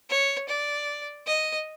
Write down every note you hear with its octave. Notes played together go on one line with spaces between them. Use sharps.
C#5
D5
D#5